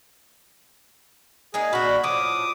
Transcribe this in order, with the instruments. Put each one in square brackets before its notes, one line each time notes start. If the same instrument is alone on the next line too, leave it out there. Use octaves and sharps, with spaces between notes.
[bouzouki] G#3 A#3 D#4 [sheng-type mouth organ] G#4
[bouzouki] A#2 D4 [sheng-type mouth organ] F#4 B5
[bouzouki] A2 F3 [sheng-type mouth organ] D6 D#6